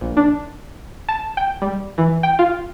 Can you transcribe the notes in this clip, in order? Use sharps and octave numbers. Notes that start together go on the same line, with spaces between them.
A#1
D4
A5
G5
G3
E3
G5
F4